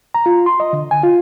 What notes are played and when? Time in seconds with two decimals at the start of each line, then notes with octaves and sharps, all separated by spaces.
0.14 A#5
0.26 F4
0.46 C6
0.60 D#5
0.73 D3
0.91 G#5
1.03 F4